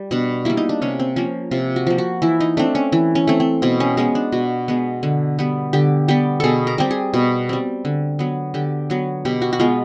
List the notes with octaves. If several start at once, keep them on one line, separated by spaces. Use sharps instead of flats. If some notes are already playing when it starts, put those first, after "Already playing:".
Already playing: G3
B2 D4
G3 A#3 E4
D#4
D4
C3 C#4
C4
F3 A#3 C#4
C3 F4
F#4
F3 A#3
F#4
E3 E4
D#4
A3 C4 D4
C#4
E3
C#4
A3 C4
C4
B2 C4
C#4
G#3 B3 C#4
D4
B2 F#4
G#3 B3
D3
G3 B3
D3 G4
G3 B3 G4
B2 G#4 A4
A#4
G3 C4 G4
G#4
B2
G3 C4
D3
F#3 B3
D3 G4
F#3 B3
B2 G4
F#4
F#4
G#3 B3 F4